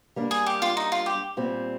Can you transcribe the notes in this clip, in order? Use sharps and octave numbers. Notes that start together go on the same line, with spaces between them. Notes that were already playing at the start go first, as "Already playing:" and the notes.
G3 A#3 D4
G#4
G4
F4
D#4
F4
G4
A#2 G3 C4